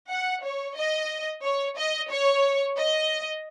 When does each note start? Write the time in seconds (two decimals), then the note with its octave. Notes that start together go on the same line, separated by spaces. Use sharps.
0.10 F#5
0.44 C#5
0.77 D#5
1.44 C#5
1.78 D#5
2.11 C#5
2.78 D#5